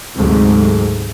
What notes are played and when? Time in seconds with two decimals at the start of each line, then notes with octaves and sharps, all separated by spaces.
0.16 D2 G#2 C3 F#3 A3